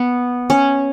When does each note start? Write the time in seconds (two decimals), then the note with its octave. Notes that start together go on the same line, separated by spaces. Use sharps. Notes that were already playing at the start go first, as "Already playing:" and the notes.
Already playing: B3
0.50 C#4